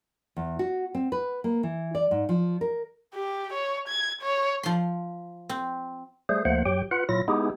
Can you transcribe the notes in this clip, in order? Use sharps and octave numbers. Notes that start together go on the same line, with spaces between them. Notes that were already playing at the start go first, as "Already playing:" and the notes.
E2
F#4
C4
B4
A#3
E3
D5
G#2
F3
A#4
G4
C#5
G#6
C#5
F3 C6
C4
G3 A3 G#4 C5
D2 F3 A3 A#3 C5 F#5
F#2 F#3 G4 G5
F4 B4 F#5
A#2 F#3 E4 F4 A#6
G#3 B3 D#4 E4 G4 G#4